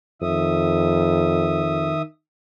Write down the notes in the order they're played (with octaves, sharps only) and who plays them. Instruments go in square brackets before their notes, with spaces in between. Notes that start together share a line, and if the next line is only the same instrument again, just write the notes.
[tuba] F2 [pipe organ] D#3 E5 D#6